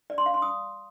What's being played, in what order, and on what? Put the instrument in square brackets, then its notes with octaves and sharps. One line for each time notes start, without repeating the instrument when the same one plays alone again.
[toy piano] D5
C6
F5
C6
D#6